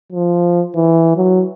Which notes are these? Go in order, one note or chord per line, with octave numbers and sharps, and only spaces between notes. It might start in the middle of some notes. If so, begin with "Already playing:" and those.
F3
E3
F#3